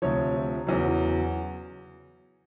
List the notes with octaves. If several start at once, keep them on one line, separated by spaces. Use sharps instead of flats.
D2 C3 F3 C#5
E2 C#3 F#3